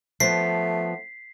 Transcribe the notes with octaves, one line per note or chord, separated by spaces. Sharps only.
F3 A3 B3 B6 C7